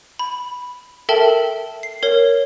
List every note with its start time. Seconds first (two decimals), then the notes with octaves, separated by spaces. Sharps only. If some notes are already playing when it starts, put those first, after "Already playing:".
0.19 B5
1.09 A4 A#4 E5 G5 A5
1.83 C7
2.03 A#4 C#5